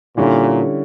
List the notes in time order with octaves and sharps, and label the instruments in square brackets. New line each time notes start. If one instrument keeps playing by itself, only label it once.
[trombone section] A#2 [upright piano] D3 G3 C#4 E4